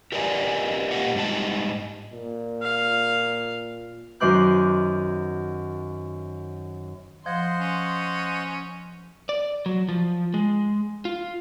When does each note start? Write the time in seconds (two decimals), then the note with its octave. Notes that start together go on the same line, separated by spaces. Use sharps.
0.12 G4 A#4 B4 D5 D#5 G#5
0.91 A#3 F4 G4 A#4 D#5 F#5
1.15 G#2 G3 D#4 G4 A5
2.13 A#2
2.62 F5
4.20 F#2 D#3 C5 D6 F#6 G6
7.26 F3 C5 D#5 F#5 C6
7.57 C#4
9.29 D5
9.66 F#3
9.89 F3
10.34 G#3
11.05 F4